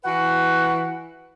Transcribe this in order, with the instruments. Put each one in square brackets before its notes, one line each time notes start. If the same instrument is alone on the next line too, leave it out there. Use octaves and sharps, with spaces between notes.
[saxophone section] E3 F#4 B4 F#5